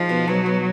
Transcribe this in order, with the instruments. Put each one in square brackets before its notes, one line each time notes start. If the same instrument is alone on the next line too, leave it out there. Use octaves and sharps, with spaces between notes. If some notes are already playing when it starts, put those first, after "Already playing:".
Already playing: [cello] F3 [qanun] G#3 D#4
[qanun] B2
[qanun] B2 [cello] F#3
[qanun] B3